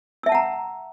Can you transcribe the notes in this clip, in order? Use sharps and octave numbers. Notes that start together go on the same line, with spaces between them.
E5 F#5 A5 A#5 E6